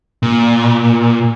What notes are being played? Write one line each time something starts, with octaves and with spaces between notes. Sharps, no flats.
A#2